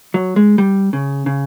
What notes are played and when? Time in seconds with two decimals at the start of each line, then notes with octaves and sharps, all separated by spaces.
0.14 F#3
0.36 G#3
0.58 G3
0.93 C#3
1.26 C#3